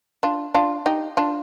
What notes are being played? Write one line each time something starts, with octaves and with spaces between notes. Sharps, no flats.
D4 F4
D4 F4
D#4 G4
D4 F4